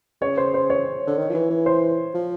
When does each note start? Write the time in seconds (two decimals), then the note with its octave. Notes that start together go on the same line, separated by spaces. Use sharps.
0.22 C#3 C#5
0.37 C5
0.54 C5
0.70 C#5
1.07 D3
1.18 D#3
1.29 F3
1.34 E3
1.50 E3
1.66 C5
2.14 F3